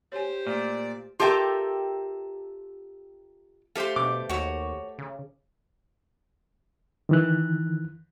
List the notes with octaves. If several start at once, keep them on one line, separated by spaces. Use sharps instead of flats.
G4 C5 C#5 G#5
A#2 A3 D5
F4 G4 A4 A#4 E5 G5
A3 G4 C5 F5 C6
B2 D6
D#2 F#4 C#5
C#3
D#3 E3 F#6